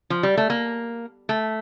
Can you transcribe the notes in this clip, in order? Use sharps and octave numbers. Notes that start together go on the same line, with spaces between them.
F3
G3
A3
A#3
A3